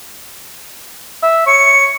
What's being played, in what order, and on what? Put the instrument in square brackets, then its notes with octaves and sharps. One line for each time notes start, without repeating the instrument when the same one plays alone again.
[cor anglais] E5
[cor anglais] C#5 [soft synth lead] C#7